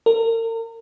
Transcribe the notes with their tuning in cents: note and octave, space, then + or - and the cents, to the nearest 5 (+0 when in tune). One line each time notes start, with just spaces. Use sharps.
A#4 -40